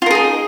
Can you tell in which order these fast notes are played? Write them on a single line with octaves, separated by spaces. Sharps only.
F4 A#4 G#4 D#4